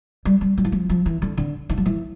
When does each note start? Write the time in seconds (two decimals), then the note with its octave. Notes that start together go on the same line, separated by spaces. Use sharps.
0.25 G3
0.41 G3
0.58 F3
0.65 E3
0.72 F3
0.89 F3
1.06 E3
1.22 D3
1.38 D3
1.70 D#3
1.78 F3
1.86 E3